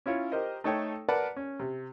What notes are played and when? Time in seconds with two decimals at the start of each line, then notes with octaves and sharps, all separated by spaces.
0.06 C#4 E4 F4 C#5
0.32 G4 A#4 C5 D#5
0.64 A3 D#4 A4 C#5 G5 D#6
1.08 A#4 B4 D5 F#5 A5 B5
1.37 C#4
1.60 C3